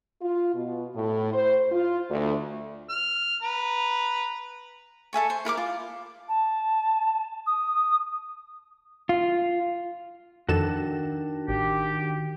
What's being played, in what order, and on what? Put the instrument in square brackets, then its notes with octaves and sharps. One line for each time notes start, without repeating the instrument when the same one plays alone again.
[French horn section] F4
B2
A2
C5
F4
D2
[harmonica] F6
B4 A#5
[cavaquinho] A4 E5 G#5 C#6
C5
E4 A#4 E5 D6
F4
[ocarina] A5
D#6
[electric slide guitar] F4
[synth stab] F2 A4 E7 [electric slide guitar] D#3 D4 F#4
[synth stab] A1 [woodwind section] G4